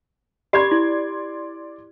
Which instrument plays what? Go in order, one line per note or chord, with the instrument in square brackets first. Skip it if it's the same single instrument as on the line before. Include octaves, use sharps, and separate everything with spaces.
[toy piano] G4 B5 [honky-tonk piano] D5 C6 G#6
[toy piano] E4